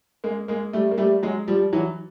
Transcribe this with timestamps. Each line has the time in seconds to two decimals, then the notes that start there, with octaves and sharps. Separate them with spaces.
0.24 G#3 A#3
0.48 G#3 A#3
0.73 G3 A3
0.91 A#3
0.98 G3 A3
1.23 F#3 G#3
1.48 F3 G3
1.73 E3 F#3